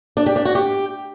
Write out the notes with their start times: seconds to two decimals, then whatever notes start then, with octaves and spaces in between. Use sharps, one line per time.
0.17 D4
0.26 G4
0.36 D4
0.45 F#4
0.55 G4